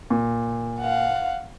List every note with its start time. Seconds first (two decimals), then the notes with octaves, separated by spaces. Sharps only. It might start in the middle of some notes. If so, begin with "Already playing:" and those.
0.10 A#2
0.80 F5 F#5